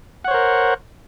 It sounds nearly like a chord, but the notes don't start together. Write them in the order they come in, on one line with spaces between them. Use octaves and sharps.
F#5 C#5 C5 A#4